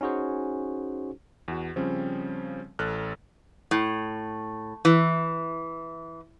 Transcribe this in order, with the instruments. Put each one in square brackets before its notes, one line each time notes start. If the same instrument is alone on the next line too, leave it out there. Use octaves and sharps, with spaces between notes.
[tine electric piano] C#4 D#4 F#4 G#4 C5
[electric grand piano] E2 F#4
C#3 F3 G3 C4 C#4
A1 A4 F6 F#6
[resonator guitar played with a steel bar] A2
E3